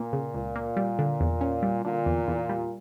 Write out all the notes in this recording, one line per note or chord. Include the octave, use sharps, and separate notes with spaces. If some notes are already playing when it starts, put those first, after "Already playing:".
Already playing: A#2 A#3
C#3
C#2
A#3
G3
D3
E2
C#4
G3
A#2 D3
E2
E2
G3